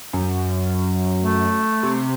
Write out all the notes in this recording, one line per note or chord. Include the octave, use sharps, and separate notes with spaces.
F#2
A3
C3